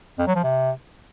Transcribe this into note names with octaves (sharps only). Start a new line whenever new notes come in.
F2
F#3
F3
C3